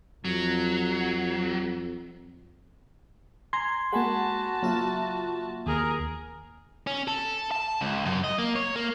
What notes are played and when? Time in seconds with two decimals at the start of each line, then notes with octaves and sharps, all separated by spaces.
0.25 F2 F#3
3.53 G#5 A#5 C6 G#6
3.92 G#3 A#3 F#4 F#5 G#5 A5 B5
4.63 C#3 F#3 A#3 F4 E5
5.66 D#2 G#4 A#4
6.87 C#4
7.08 A4
7.52 A5
7.81 C#2
8.05 F#2
8.24 D#5
8.38 A#3
8.56 C#5
8.76 A#3